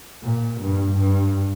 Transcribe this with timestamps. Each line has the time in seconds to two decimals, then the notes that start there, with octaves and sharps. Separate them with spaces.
0.23 A#2
0.61 G2
0.98 G2